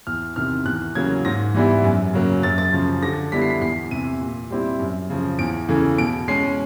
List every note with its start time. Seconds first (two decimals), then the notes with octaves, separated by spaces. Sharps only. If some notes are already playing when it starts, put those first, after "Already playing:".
0.07 E2 F6
0.36 C3 D#3 F6
0.66 E2 F#6
0.95 C#3 F#3 A#3 G#6
1.25 G#2 A#6
1.54 E3 G3 B3 E4
1.84 F#2
2.13 C#3 F#3 A#3
2.43 F#2 A6
2.58 A6
2.72 C#3 F3
3.02 D3 A#6
3.32 G3 B3 E4 B6
3.42 C7
3.50 B6
3.61 E2 C7
3.91 C3 E3 D#7
4.21 A#2
4.50 G3 C4 E4
4.80 F#2
5.10 C#3 F3
5.39 E2 D7
5.69 C#3 E3 A3
5.98 B2 D7
6.28 G#3 C#4 C7